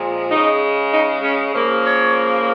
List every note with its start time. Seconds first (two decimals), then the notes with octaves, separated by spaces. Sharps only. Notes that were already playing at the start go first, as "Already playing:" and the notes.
Already playing: A#2 F3 G#3
0.31 C#3 G#3 D#4
0.92 D#4
1.22 C#4
1.54 C#3 F3 A#3
1.84 C#5